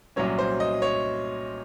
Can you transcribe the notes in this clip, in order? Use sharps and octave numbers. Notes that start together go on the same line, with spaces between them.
C2 A#2 F#3 C#4 C#5
C5
D#5
C#5